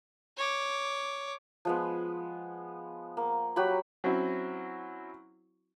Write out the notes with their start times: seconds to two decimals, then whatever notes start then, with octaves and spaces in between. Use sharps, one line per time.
0.37 C#5 D6
1.65 F3 G#3 B3
3.17 A#3
3.56 F#3 F#4 G4 B5
4.04 F#3 C4 C#4 E4 F#4